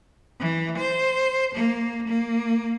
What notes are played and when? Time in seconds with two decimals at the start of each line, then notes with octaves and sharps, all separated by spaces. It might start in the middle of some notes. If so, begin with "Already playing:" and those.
0.40 E3
0.78 C5
1.55 A#3
2.08 A#3